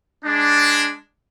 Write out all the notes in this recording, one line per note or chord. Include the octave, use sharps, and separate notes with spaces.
G#3 D4